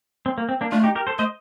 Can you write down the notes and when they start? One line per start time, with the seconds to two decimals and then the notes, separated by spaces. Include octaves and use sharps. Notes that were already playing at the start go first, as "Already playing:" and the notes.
0.26 C4
0.38 A#3
0.49 C4
0.61 A#3 D4
0.72 A3 D4 F4
0.84 D#4 G4
0.95 G4 A#4
1.07 A4 C5
1.18 A3 C5 D#5